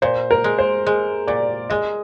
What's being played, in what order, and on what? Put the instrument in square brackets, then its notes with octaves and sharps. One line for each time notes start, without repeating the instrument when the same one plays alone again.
[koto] A#2 [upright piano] C5
[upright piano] A#4
[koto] G#3
[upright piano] C5
[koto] G#3
[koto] A#2 [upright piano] D5
[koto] G#3 [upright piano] D#5